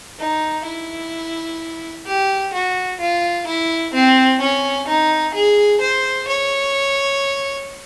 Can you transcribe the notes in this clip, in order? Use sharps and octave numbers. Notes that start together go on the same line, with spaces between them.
D#4
E4
G4
F#4
F4
E4
C4
C#4
D#4
G#4
C5
C#5